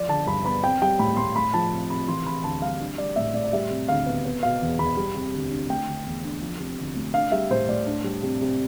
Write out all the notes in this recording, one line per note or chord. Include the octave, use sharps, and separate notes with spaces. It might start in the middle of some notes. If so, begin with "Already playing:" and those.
Already playing: F3 D5
D3 A5
G2 B5
B3 B5
C4 G5
G3 G5
A2 B5
A2 C6
A3 B5
F3 A5
C3
C3 B5
E3 C6
C3 B5
D2 A5
G3 F5
D4
G3 D5
A2 E5
A2 D5
D5
G3 E5
C3
D2 F5
B3
B3
B2 F5
E2
E2 B5
G3
C3
D2
D4
A3 G5
D3
E2
D4
F3
C3
D2
A3
D4 F5
G3 E5
A2 C5
A2 D5
D4
G3
C3
C3